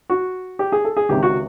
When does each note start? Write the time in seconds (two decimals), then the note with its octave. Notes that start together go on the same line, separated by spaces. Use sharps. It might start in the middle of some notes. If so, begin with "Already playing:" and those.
0.10 F#4
0.59 G4
0.72 G#4
0.85 A4
0.97 G#4
1.09 C#2 C3 D#3 G4
1.23 F#4